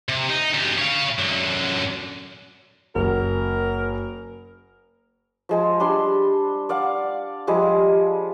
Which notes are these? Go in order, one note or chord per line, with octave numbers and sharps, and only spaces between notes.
C3
D#4
D2 G3
C#5 F5
F#2 D3
F#1 A#4
F3 G#3 C5
G3 D4 C6
D5 F5 F#5
F3 G3 G#3